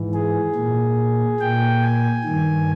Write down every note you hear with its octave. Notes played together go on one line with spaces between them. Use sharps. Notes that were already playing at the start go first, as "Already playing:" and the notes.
Already playing: G#2 E3
G#4
A#2
A#2 G5
G#5
G2 D#3